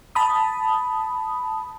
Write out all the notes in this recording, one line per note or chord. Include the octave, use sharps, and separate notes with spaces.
A5 B5 D#6